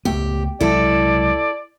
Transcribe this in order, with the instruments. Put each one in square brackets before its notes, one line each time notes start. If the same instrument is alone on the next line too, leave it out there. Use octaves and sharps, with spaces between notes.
[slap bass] C#2 A3 B3 [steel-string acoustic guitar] G4
[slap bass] C2 F#3 G#3 [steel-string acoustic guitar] E4 A4 [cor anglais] D5